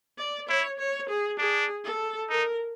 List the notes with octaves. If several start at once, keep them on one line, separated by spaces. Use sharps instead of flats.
D5
E4 C#5
C#5
G#4
D4 G#4
A4
D#4 A#4